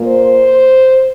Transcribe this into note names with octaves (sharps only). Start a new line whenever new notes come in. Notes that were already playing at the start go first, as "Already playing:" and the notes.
Already playing: A#2 A#3
C5